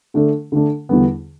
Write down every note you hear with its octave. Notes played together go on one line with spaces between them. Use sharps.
D3 A3 D4
D3 A3 D4
E2 D3 G3 B3